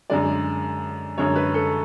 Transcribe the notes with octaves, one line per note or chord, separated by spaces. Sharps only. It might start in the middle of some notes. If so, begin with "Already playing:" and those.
F#2 D3 G#3 D5
F#2 D3 G#3 C#5
B4
A4